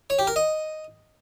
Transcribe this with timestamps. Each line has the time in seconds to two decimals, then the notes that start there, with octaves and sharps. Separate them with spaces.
0.10 C#5
0.19 G4
0.27 A#4
0.36 D#5